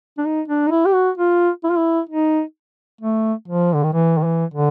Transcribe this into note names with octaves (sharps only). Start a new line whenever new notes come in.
D4
D#4
D4
D#4
E4
G4
F#4
F4
E4
F4
E4
D#4
A3
F3
D3
D#3
E3
D#3
E3
D3